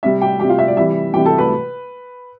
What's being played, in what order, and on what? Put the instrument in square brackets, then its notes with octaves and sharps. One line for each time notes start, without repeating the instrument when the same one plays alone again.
[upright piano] C3 G3 E5
G4 G5
C3 G3 G4 G5
F4 F5
E5
D5
C3 E3 G3 E5
C3 E3 G3 G4 G5
A4 A5
B4 B5